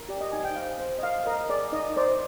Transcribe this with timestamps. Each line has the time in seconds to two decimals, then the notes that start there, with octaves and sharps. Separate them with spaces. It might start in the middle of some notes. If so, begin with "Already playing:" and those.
Already playing: A#4
0.09 G4 D5
0.21 D#5
0.32 D#4 G#5
0.44 G5
0.55 C5 F5
0.79 C5
0.99 D#5
1.03 A#4 F5
1.26 A#4 D#5
1.49 G#4 D5
1.72 D#4 D#5
1.96 C5 D5